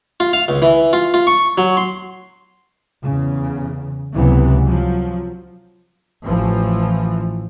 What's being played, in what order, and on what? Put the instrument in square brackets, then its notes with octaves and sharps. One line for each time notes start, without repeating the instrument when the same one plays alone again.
[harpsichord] F4
F5
C#2
E3
F4
F4
C#6
F#3
C6
[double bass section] E2 C#3
C#2 C3 E3 F#3 B3
F3 F#3
A1 E3 F3